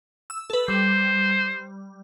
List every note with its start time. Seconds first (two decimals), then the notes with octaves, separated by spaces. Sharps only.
0.30 E6
0.50 A4 B4
0.68 G3 C5